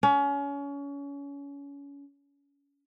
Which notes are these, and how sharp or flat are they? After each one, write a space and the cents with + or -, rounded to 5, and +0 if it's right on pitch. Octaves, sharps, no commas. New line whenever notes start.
C#4 +30